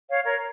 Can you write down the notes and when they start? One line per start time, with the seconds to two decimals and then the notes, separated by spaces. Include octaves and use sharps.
0.09 C#5 F5
0.24 A#4 C#5